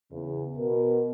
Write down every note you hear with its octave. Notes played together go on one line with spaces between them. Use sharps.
E2 C#3
B2 A#4